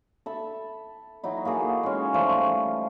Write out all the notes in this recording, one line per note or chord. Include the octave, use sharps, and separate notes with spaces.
A4 E5 B5
F#3 D#4 E4
A#3 F#4 G#4 A4
G#3 C#4
F3 G3 A3 F4